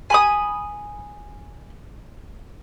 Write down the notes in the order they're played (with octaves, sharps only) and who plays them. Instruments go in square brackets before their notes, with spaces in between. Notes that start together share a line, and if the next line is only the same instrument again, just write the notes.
[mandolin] G#5 B5 D#6